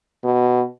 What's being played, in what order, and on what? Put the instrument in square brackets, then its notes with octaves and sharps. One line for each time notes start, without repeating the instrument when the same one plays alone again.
[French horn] B2